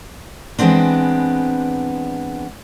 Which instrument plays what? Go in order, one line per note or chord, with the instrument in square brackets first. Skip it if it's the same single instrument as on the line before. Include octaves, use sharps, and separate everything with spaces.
[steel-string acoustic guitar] E3 G#3 A3 B3 C4 D4